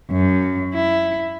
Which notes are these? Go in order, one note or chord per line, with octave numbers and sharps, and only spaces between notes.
F#2
E4